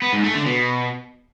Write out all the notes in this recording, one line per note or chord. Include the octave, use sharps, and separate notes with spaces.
B3
G#2
A3
D3
B2